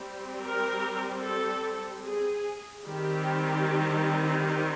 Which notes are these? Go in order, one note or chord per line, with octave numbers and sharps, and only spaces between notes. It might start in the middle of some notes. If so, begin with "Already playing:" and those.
Already playing: G3 C4
A#4
A4
G#4
D#3 G3 C4 G4